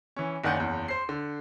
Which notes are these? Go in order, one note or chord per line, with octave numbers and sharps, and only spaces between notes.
E3 C#4
F#1 D#3 D5 F#5 G#5 G6
F#1 E2
C5 C7
D3